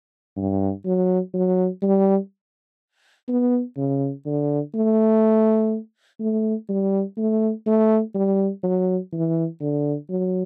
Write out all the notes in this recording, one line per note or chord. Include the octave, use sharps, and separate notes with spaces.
G2
F#3
F#3
G3
B3
C#3
D3
A3
A3
G3
A3
A3
G3
F#3
E3
D3
F#3